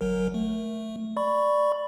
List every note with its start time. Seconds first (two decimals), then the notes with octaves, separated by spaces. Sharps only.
0.01 G1 F#3 A#4
0.34 A3
1.17 D5 B5 C#6